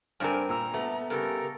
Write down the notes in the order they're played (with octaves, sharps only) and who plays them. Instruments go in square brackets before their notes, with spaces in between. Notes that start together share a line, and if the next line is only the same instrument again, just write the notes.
[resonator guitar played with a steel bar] G2 C4 A#4 [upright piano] D4 C5 [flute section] G#5
[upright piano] A#2 E6 [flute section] A#5
[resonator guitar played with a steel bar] A3 [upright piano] B3
[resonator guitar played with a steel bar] G2 C#3 [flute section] G4 A4 A#4